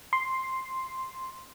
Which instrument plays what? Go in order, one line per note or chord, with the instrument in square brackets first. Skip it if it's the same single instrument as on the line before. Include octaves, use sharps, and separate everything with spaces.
[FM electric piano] C6